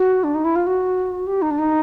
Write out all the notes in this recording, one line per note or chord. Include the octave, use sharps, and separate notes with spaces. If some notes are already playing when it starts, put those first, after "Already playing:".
Already playing: F#4
D4
D#4
E4
F4
F#4
G4
D#4
D4
D#4